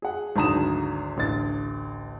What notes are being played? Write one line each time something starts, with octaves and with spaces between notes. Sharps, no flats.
G#4 F#5
G#1 D2 F#3 A#5 D#6 E7
A1 D2 A6